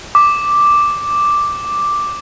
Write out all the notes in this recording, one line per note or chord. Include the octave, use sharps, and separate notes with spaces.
D6